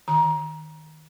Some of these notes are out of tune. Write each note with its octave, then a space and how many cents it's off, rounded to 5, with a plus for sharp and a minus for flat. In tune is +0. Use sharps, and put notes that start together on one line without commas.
D#3 +0 A#5 +25